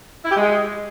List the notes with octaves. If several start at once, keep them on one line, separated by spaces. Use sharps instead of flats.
E4
G4
G#3